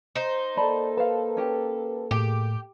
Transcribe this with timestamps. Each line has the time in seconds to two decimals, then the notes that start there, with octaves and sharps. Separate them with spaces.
0.15 D#4 C5
0.57 A#3 A4 D5 A5 B5
0.97 B4 F5 A5
1.37 C#4 G4
2.11 A2 G4 G#4